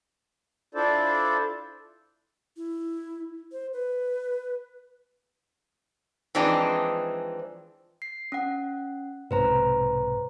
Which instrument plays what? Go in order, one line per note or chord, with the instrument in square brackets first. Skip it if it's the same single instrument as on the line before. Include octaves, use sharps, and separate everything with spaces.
[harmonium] D4 E4 F4 A4 C5 D5
[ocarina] E4
C5
B4
[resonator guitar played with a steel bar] E3 F3 G#3 C4 D4 D#4
[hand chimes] C7
C#4 F#5
[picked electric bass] B1 G#2 C3 [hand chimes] B4 C5 A#5